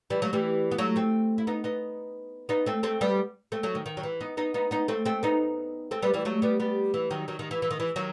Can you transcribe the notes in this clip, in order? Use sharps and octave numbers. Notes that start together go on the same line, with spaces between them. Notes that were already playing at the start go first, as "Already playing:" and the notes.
E3 G3
F#3 A3
E3 G3
B3
F#3 A3
A3 C4
E4
B3 D#4
B3 D#4
B3 D#4
A3 C4
A3 C4
G3 B3
A3 C4
F#3 A3
D#3
D#3
F#3
E3
B3 D#4
B3 D#4
B3 D#4
B3 D#4
A3 C4
A3 C4
B3 D#4
A3 C4
G3 B3
E3 G3
F#3 A3
G3 B3
G3 B3
E3
D#3 F#3
D#3 F#3
D#3
E3
E3
D#3
E3
D#3 F#3